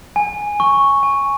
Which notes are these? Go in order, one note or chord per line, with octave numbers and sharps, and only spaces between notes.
G#5
C#6
G#5